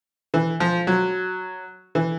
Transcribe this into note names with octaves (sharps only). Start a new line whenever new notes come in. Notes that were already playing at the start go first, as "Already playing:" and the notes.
E3
F3
F#3
E3